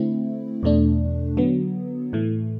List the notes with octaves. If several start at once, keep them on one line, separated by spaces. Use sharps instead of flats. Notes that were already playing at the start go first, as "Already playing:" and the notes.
Already playing: D3 A3 C4 E4
E2 B2 A3 D4
D3 F#3 B3
A2 E3 A3